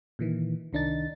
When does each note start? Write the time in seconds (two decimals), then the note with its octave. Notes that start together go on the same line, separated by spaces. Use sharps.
0.19 A#2 D#3 E3
0.73 C2 D#3 D4 D#4 A6